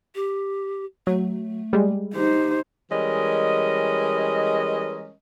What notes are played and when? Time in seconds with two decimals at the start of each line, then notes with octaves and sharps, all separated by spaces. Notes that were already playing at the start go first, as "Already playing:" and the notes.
0.15 G4
1.07 F#3 A3
1.73 G3 G#3
2.14 D#4 G4 C5
2.91 E3 G3 G#3 C#4 A#4 D#5